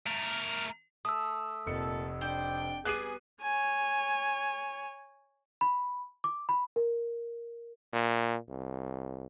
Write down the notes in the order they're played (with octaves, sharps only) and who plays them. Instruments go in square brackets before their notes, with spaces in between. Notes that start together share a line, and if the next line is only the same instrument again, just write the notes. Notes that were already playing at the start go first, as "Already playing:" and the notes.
[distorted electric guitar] A3 A#4
[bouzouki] A3 [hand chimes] D#6 E6
[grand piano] F1 F2 C#7 [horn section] A#2 A4
[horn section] D4 D5 G5 [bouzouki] C5
[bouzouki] G3 B3 [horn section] G#4 [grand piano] F#6 C7 D#7
[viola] C#5 G#5
[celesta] B5
D6
B5
A#4
[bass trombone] A#2
C2